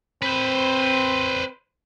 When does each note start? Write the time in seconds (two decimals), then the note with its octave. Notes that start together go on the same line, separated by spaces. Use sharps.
0.22 C4 B4 C5